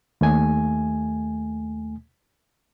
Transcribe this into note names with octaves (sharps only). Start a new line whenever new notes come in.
D#2 A3 G#5